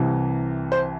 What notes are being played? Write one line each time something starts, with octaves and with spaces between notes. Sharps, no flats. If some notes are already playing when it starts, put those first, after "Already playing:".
Already playing: C2 C3 E3
C5